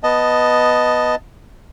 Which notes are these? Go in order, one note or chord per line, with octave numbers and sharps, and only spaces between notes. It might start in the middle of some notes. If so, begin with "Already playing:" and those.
B3 D#5 A5